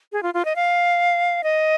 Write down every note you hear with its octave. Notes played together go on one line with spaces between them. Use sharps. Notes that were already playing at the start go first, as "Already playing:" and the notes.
G#4
F4
F4
D#5
F5
D#5